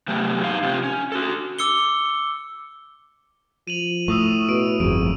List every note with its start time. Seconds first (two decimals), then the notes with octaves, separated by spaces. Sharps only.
0.08 C3 F#3 A3 B3 G4
0.43 G#2 D#4 F5
0.63 C3 C4 F4 G4
0.83 C#4
1.12 F#4 A4
1.59 D6 E6 C#7 G7
3.67 F3 D#7 F7 F#7
4.08 A2 C#6 D#6 E6
4.49 B2 D7
4.80 G1 F2 G#3 D7